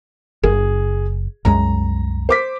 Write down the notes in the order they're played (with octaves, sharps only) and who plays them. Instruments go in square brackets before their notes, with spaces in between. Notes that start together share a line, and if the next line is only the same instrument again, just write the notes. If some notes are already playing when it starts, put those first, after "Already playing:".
[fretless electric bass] F#1 [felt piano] G#4
[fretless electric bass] C2 F#2 G#3 [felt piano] A#5
[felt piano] C5 D6 B6